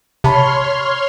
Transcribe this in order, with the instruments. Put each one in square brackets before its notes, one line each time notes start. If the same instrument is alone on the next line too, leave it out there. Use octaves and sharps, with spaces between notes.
[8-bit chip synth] C3 [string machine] C#5 C6 F6 [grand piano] A5 B5